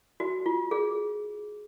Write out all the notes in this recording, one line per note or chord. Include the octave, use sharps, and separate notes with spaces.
F#4
F4
G#4